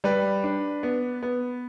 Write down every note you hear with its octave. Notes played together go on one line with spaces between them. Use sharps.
G3 B4 D5
D4
B3
B3